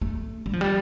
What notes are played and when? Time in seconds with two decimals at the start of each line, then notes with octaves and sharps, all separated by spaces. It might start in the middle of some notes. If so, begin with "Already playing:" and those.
0.01 A3
0.46 G3
0.53 F3
0.61 G3